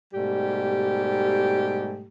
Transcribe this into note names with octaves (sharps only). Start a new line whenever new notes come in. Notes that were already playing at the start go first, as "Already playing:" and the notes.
G#2 B2 G3 A3 G4